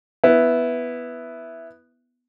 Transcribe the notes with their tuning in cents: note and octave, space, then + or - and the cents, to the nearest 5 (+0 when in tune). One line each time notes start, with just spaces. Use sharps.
B3 +0 E4 +0